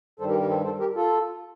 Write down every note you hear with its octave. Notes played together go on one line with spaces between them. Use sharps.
G2 D#3 G3 A4 C5
G4 A#4
G4 A#4
A4 C5
A4 C5
G4 A#4
F4 A4